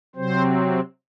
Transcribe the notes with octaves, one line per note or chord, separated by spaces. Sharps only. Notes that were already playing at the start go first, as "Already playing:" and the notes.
C3 F#3 C4 C5